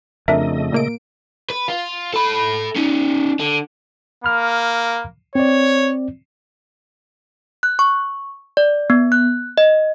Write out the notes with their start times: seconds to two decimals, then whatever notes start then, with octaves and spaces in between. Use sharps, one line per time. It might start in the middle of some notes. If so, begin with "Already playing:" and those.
0.28 F2 C#3 A3 D4 A#4 D#5 E5
0.72 A#2 A#3 D7
1.50 B4
1.68 F4
2.14 A4 B5
2.76 C#4 D#4
3.39 D3
4.24 A#3 B5 F6
5.35 C4 C#5 D5
7.63 F#6
7.79 C#6
8.57 D5
8.90 B3
9.12 F#6
9.58 D#5